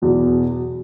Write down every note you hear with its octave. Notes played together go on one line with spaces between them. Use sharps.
E2 B2 F#3